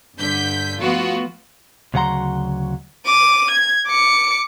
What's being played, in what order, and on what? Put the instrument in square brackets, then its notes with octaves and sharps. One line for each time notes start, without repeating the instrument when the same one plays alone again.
[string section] G2 D3 G6 B6
F3 A3 B3 F4 F#4
[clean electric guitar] D2 C#3 F#3 F#5 A#5 C6
[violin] D6 D#7
G#6
D6 C#7